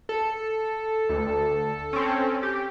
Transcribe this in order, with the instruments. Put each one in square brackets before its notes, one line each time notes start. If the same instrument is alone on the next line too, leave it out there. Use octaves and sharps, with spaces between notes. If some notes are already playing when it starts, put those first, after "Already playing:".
[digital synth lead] A4
[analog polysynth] D2
C4 C#4
G4